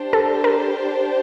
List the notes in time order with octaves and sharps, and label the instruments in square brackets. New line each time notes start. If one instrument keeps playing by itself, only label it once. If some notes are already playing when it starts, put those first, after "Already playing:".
Already playing: [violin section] D4 G4 C5
[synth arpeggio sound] A4
A#4